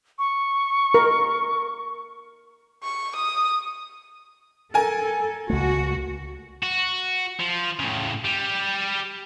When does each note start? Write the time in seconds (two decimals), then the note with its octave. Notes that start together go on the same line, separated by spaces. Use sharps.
0.19 C#6
0.94 A#4
2.83 C#6
3.16 D#6
4.74 A4 A#4 G#5
5.50 C#2 A3 F#4
6.63 F#4
7.40 F3
7.79 A2 C#3
8.25 G3